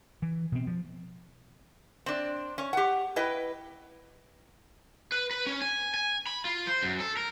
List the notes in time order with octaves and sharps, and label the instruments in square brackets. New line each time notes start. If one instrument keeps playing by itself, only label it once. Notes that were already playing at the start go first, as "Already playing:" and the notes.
[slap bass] E3
B2 C4
F3
[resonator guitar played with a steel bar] C4 D4
C#4
G4 F#5
E4 B4 D#5 G5
[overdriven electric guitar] B4
B4
C#4
G#5
G#5
B5
F4
C5
F#2
A4
A#4